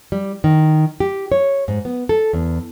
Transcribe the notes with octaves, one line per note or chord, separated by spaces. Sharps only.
G3
D#3
G4
C#5
G#2
B3
A4
E2